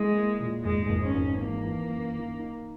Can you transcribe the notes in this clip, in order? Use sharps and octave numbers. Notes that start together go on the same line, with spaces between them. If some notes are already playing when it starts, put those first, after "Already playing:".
Already playing: G#3 E4
A#3
A#2
G#1 G#3
G#1
C#4
G#1
E3 A#3
E3
F#2
D#3
D#4